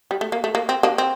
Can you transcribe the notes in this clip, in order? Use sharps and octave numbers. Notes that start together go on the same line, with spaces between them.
G3
A3
A#3
A3
A#3
C4
A#3 D4
C4